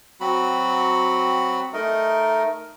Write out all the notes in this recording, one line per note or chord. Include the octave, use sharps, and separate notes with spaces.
F#3 C4 F#4 B5
A3 D#4 A#4 D#5